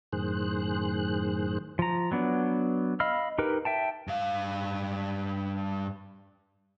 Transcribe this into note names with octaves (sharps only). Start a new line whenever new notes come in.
F#2 A2 D#3 G#4 C5 F#6
F3 A#5
F#3 B3 D4
D#5 F5 B5 E6 F6
D#4 G4 A#4 B4
E5 G5 A5
G2 F5